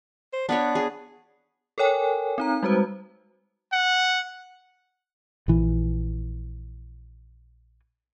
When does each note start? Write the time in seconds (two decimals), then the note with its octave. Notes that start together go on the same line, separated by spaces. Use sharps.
0.33 C5
0.49 B3 D4 B4 C#5
0.75 G#4
1.78 A4 A#4 C#5 G5 G#5
2.38 C4 D#4 A#5
2.63 G3 G#3 F#4 B4 C5
3.73 F#5
5.48 A#1 E3